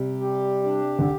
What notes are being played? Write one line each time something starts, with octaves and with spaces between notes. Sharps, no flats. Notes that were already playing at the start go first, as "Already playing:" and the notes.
Already playing: C3 G3
G4
D4
D3